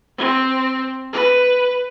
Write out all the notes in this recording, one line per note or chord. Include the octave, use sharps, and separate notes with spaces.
C4
B4